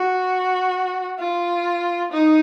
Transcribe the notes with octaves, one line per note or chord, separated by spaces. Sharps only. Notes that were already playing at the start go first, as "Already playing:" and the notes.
Already playing: F#4
F4
D#4